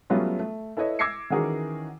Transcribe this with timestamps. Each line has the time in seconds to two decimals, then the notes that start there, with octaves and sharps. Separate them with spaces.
0.10 F#3 G3 A3 B3 C#4 F4
0.39 A3
0.77 E4 A4 B4 C#5 D#5 E5
0.99 D6 E6 G#6 A#6 C7 C#7
1.30 D#3 E3 C#4 F#4 G#4 A#4